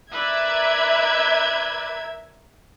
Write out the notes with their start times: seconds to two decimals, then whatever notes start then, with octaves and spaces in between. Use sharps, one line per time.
0.12 A#4 B4 D5 E5 G#6